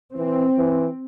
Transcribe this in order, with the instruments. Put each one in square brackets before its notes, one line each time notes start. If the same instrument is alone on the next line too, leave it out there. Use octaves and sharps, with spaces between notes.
[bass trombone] E3 [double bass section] C4
[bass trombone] E3